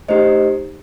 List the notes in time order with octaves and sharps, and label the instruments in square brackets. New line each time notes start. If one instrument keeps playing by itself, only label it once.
[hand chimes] A3 D#4 G4 C5 D#5